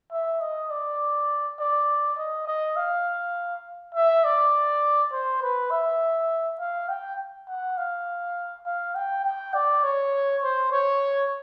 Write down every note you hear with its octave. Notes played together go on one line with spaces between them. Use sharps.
E5
D#5
D5
D5
D#5
D#5
F5
E5
D5
C5
B4
E5
F5
G5
F#5
F5
F5
G5
G5
D5
C#5
C5
C#5